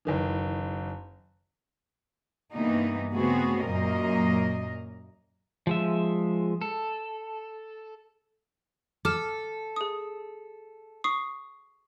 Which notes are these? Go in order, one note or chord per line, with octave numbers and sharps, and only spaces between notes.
F#1 D#3 E3
G2 C3 E3 A#3 B3 D#4
C#3 A3 B3 C4 F#4 G#4
F#2 A#2 A#3 A#4 D#5
F3 G#3 E5
A4
A4 D6 F6 E7
G#4 D#6
C#6 D#6 C7